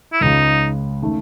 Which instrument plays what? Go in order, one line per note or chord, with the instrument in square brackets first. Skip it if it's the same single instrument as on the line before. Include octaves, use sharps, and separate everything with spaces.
[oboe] E4
[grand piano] C#2 C#3 G#3 [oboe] D#4
[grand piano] D#3 A3 C#4